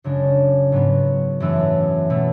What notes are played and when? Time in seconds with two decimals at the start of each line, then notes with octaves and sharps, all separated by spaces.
0.04 F#2 C#3 G#3 D4
0.72 G#2 F#3 B3
1.40 F#2 E3 A3
2.10 B2 A3